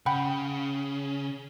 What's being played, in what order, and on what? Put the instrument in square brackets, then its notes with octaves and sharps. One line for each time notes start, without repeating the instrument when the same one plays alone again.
[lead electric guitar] C#3 [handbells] F#5 G5 B5